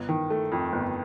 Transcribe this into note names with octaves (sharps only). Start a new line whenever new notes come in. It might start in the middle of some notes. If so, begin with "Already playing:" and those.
Already playing: G1
D#3
A3
F2
G1